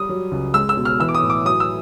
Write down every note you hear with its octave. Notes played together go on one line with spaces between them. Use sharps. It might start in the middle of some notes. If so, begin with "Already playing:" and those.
Already playing: G3 D#6
F#3
C#2
G#3 E6
E6
B2
F6
E3 E6
D6
D#6
A2
D6
F#3 D#6
E6